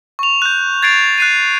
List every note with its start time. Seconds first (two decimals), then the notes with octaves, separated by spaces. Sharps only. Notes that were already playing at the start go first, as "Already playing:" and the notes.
0.19 C#6 F7
0.42 F#6 G6
0.83 G#6 A6 C7 D7 F7
1.18 F#6 C7 D#7